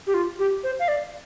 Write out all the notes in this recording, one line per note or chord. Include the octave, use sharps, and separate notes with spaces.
G4
F4
G4
C5
F5
D5